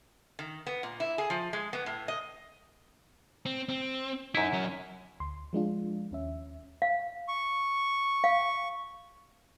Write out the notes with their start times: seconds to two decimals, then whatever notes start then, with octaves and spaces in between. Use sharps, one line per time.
0.39 D#3
0.67 B3
0.83 A#2
1.00 E4
1.18 G#4
1.30 F3
1.53 G#3
1.73 B3
1.86 A2
2.08 D#5
3.46 C4
3.69 C4
4.35 F#2 D#4 E4
4.53 F#3 C#4
5.20 D2 C6
5.53 F3 G#3 D4 F4
6.11 D#2 C#4 E5
6.82 F5
7.28 C#6
8.24 F5